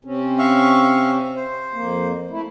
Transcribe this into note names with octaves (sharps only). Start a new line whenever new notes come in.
C3 C4 C#4
E5 F5 C#6
C5
F2 A#3
A3 E4